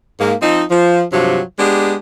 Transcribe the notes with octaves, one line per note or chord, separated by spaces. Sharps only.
G#2 A#3
F3 C4 D#4
F3
G2 C3 F3 F#3
G#3 B3 D4 G4